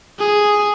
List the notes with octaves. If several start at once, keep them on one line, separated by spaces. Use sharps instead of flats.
G#4